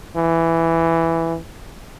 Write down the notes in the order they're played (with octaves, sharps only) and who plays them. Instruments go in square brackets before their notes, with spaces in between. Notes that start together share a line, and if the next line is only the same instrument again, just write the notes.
[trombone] E3